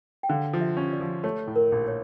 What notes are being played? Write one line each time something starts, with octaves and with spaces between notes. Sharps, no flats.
G5
D3 F5
F3
E5
C#4
D5
F3
A3 C#5
A2
A#4
A#1
C#5